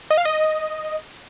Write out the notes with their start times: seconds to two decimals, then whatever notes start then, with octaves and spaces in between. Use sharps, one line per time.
0.10 D#5
0.18 F5
0.25 D#5